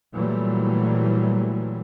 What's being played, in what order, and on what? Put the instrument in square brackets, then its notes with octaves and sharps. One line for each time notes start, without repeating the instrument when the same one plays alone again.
[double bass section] A#2 E3 F#3 G3 A3